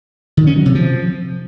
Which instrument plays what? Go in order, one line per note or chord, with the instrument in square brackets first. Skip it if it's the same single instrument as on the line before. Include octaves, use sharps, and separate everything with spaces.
[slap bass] D#3
C#4
F#3
C3
F3